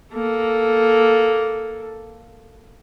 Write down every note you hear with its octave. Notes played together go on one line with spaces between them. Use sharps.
A#3 A4